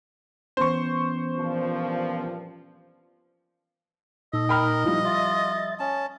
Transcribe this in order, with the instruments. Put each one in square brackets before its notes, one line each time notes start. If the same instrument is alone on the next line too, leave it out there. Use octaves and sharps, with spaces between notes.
[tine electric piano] E3 B3 C#4 [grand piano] C5 C#6
[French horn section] G2 A#2 F3
[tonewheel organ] A#2 D#4 [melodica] A4 [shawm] D#5
[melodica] A#4 [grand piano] G5 B5 F6
[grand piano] F3 G3 [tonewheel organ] D#4 E4
[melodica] F4 [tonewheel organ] E5 A6
[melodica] C#4 A5